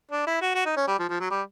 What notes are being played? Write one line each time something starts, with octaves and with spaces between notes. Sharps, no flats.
D4
E4
F#4
F#4
D#4
C#4
G3
F3
F3
F#3
G3